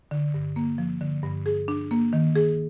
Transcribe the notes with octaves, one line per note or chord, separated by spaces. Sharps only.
D3
G2
A#3
F3
D3
G2
G#4
D4
A#3
D#3
G#4